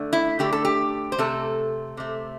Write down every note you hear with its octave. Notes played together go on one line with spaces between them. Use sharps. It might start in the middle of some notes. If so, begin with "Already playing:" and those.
Already playing: D3 A3
E4
D3 A3 G4
A4
G4
C5
C3 A3 A4
C3 A3